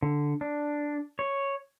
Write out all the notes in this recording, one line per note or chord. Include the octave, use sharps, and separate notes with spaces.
D3
D4
C#5